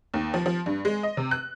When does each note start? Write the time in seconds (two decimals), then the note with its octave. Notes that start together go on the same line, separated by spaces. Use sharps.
0.14 D#2
0.34 F3
0.46 F3
0.66 G2
0.85 G#3
1.03 D#5
1.17 C3
1.31 F#6